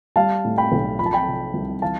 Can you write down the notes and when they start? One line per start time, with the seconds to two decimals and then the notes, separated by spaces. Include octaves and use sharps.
0.16 G3 F5 A5
0.45 A2
0.58 G5 B5
0.72 B1
0.99 F3 B5
1.06 A5
1.13 G5 B5
1.27 C3
1.54 C2
1.82 E3 F5 A5